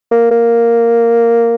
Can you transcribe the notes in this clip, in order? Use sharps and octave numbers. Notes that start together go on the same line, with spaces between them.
A#3
A#3